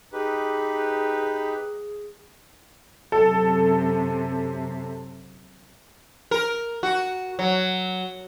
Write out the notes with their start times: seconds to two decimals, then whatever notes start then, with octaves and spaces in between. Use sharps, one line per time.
0.13 D#4 G4 G#4 B4
3.12 F#2 C3 A4
6.31 A#4
6.83 F#4
7.39 F#3